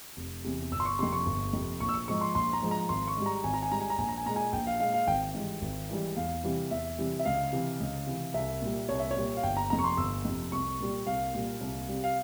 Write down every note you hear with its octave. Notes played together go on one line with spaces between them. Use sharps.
F1
E2 C3
G1 E6
C6
C#6
F2 C3 C6
C#6
G1
F2 C3
A#1 C#6
E6
C#6
G#2 F3 G#3 C#6
C6
A#1 C6
A#5
G#2 F3 G#3
A#5
G#1 C6
C#6
G#2 G3
A#5
G#1 G#5
A#5
G#5
G#2 G3 A#5
G#5
A#5
A#1 G#5
A#5
G#5
A#2 G#3 A#5
G#5
A#1 G5
F5
A#2 G#3 F5
F5
G#1 G5
G#2 E3 G3
G#1
G#2 E3 G3
E2 F5
C3 E3 G3
E2 E5
C3 E3 G3
E5
C#2 F5
C3 E3
C#2
C3 E3
C2 E5
A#2 G3
C2 C#5
E5
C#5
A#2 G3
F5
G1 G5
A#5
F2 C3 A#5
C#6
C6
G1 E6
F2 C3
C2 C#6
A#2 G3
C2 F5
A#2 G3
C2
C3 G3
F5